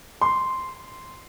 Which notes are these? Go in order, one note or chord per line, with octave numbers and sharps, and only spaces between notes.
C6